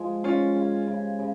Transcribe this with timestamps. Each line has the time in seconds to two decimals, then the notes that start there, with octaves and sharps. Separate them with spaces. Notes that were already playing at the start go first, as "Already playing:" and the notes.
Already playing: F3 G#3
0.24 C#3 C#4 F4
0.56 C#3
0.88 C#3
1.19 C#3